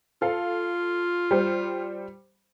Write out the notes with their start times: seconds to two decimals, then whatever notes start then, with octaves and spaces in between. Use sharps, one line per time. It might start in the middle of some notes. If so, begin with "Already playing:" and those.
0.22 F4 A4 F5
1.31 G3 C5